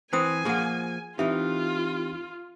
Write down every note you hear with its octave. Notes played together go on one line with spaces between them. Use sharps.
E3 C4 C5 G5 G#5 D#6
F3 A#3 G#4 F#5
E3 C4 D#4 F4 G4 E5